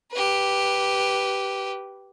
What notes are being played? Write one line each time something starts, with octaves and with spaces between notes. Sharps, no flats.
G4 B4